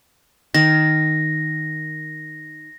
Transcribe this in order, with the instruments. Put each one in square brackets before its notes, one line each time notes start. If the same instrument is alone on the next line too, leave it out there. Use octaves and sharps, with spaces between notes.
[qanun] D#3 [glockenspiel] A#6